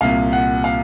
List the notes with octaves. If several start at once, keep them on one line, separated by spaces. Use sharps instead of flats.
C2 A#2 F5
F#5
F5